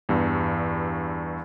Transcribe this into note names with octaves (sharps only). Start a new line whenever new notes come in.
E2 G2